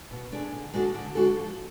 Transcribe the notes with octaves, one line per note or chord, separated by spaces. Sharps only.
B2
A3 D4 G#4
D3
G#3 D4 F#4 A4
D3
G#3 D4 F#4 A4
F3